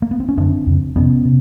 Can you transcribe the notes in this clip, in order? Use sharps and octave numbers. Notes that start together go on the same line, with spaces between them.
A#3
B3
C4
C#4
F#2 D3 C4 D4
F2 C#3
F2 C3 B3 C#4
C3